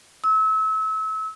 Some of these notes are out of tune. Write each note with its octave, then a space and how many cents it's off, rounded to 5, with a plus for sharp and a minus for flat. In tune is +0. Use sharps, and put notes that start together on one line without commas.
E6 -30